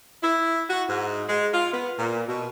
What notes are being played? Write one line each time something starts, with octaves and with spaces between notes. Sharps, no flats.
E4
F#4
G#2
G#3
F4
B3
A#2
B2